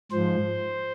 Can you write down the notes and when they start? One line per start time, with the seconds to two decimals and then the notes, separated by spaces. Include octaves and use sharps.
0.11 G#2 F3 C5